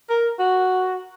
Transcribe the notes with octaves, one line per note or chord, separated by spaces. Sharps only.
A#4
F#4